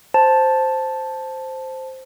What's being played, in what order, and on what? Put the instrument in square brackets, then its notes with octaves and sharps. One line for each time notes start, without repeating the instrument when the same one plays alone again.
[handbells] C5 A5